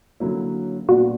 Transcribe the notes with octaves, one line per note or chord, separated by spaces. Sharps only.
D3 F#3 A#3 C#4 E4
A#2 G3 B3 D4 F#4